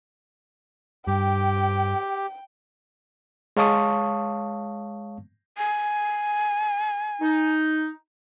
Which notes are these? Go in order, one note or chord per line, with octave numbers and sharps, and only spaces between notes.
G2 G4 G5
G#3 C#5 F5 A5 C#6 D#6
G#5
D#4